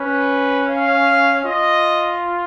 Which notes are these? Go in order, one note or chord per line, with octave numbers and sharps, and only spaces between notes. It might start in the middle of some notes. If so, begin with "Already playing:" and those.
Already playing: C#4 B4
F5
F4 D#5